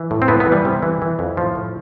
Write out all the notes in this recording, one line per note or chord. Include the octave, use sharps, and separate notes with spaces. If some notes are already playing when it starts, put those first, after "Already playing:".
Already playing: E3
A2
C4
A2 B3
B3
E3
G3
C3
E3
E3
F2
A2 F3
A2